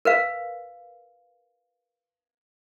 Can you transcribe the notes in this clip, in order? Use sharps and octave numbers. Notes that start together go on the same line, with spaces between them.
A#4 B4 F5